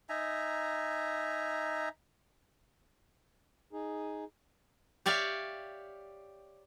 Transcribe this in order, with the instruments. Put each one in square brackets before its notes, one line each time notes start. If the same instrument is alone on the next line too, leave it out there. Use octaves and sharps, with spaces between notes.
[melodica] D#4 E5 G#5 A#5
[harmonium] D#4 G#4
[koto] G4 C#5 D5 E5 F5 G5